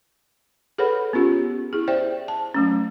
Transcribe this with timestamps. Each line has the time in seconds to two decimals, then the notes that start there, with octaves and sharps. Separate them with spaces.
0.78 G#4 A4 B4 C#5 F#5 B5
1.13 B3 C#4 F4 G4
1.73 E4 G#4
1.88 C5 D5 E5 G5
2.28 A5
2.54 F#3 A3 C#4